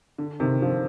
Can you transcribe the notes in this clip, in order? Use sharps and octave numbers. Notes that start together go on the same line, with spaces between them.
D3
C3 D#3
D3 F3